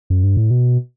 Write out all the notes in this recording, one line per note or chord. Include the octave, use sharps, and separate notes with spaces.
F#2
G2
A2
B2